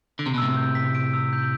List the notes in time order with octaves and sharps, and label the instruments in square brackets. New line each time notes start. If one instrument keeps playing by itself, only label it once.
[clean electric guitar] D3 [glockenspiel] D7
[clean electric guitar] C3
B2
[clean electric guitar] A2 C3 [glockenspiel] E6
[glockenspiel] G6
B6
D7
E6
G6